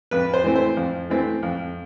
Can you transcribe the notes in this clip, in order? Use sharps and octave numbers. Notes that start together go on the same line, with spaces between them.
F2 B4
C5
E3 A3 C4
C5
F2
E3 A3 C4
F2